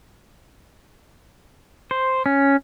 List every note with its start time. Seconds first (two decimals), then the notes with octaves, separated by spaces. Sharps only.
1.91 C5
2.26 C#4